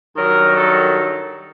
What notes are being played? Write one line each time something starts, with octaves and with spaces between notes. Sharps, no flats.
G2 D#3 F#3 A#4
A4